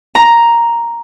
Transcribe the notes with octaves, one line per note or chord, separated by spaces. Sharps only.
A#5